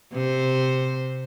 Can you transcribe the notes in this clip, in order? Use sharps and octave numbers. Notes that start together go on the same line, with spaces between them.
C3 C5